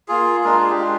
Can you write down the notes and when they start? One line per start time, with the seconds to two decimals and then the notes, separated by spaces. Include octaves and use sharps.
0.08 A#3 F4 G#4
0.44 G#3 D4 F4 A#4
0.57 G#4
0.70 G4
0.79 G#3 D4 F4